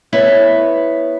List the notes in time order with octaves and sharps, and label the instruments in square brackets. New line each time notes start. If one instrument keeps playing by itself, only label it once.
[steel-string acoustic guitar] B3 E4 B4 C#5